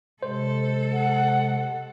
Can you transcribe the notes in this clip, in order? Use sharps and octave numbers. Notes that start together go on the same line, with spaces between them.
C3 G#3 A4 C5
F#5